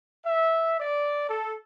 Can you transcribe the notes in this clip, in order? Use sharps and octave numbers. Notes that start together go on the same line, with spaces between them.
E5
D5
A4